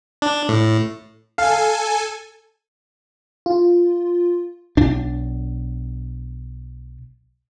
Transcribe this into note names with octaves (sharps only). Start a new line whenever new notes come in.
D4
A2
A4 F5 G#5
F4
B1 D4